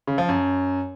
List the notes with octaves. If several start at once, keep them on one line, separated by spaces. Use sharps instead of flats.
C#3
F3
F#2